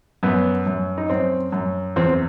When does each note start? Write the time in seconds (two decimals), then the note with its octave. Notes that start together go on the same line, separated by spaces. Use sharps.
0.23 F#2 B3
0.66 F#2
0.98 D#4
1.09 F#2 C4
1.52 F#2
1.96 E2 C4